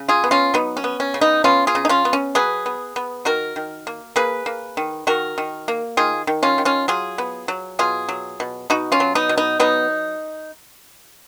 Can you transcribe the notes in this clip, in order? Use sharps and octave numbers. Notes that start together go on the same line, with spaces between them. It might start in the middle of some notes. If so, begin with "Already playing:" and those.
Already playing: C#3
F4 G#4
B3
C#4 F4
F#3 B3 D#4
C#4
B3
C#4
C#3
B3 D#4
B3 C#4 F4
F4 G#4
C#3
D#4
C#4 F4
B3
C#4
F#3 G#4 B4
B3
B3
D#3 F#4 A#4
D#3
A#3
A#3 G#4 B4
A#3
D#3
D#3 F#4 A#4
D#3
A#3
D#3 F4 G#4
D#3
C#4 F4
D#3
C#4 F4
F#3 F4 G#4
B3
F#3
B2 F4 G#4
F#3
B2
B2 D#4 F#4
C#4 F4
F#3
B3 D#4
B2
B3 D#4
F#3 B3 D#4